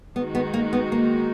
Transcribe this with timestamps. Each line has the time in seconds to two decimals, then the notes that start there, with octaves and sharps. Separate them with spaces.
0.16 D#3 G#3 B3 D#4 F#4
0.35 B3
0.54 A#3
0.73 B3
0.92 A#3